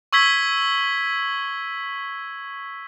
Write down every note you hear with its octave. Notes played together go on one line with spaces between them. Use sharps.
C#6 E6 G#6 B6 G7